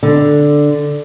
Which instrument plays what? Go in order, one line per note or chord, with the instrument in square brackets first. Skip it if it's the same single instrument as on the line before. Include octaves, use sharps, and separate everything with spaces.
[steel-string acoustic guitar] D3